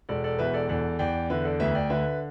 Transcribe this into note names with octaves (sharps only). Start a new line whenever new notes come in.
E1 A4 D5
A4 D5
E2 B4 E5
A4 D5
E2 A4 D5
E2 D5 G5
D3 B4 E5
A4 D5
D2 B4 E5
D5 G5
D3 B4 E5